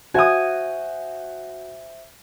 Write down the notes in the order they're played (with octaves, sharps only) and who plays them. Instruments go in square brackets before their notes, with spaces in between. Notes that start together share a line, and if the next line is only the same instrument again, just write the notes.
[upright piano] F#4 [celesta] C5 E5 G6 [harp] G#5 D#6